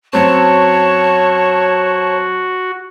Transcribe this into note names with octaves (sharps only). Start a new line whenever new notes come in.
F#2 C4 F#4 C#5 A5